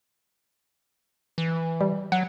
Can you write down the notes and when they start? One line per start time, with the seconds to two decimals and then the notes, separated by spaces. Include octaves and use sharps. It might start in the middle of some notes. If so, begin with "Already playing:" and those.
1.38 E3
1.81 G3
2.12 F#3 F#5